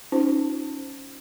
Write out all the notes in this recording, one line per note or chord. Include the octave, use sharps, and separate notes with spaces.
C#4 D#4 F4 C5